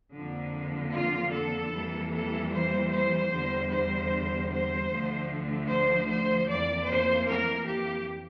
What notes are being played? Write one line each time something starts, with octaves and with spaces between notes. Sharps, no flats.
F2 D3 F3 A#3
F4
A4
F2 E3 G3 A#3
A4
C5
C5
E2 D3 G3
C5
C5
D2 D3 F3 A3
C5
C5
F2 E3 A#3 D5
C5
A#4
G4